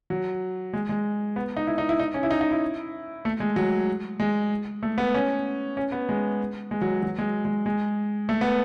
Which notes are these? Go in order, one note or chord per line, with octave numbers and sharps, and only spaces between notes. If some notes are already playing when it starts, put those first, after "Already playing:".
F#3
G#3
G#3
B3
D#4
E4
D#4
E4
D#4
C#4
E4
D#4
D#4
E4
A3
G#3
F#3
G#3
A3
B3
C#4
C#4
B3
G#3
G#3
F#3
F#3
G#3
G#3
G#3
A3
B3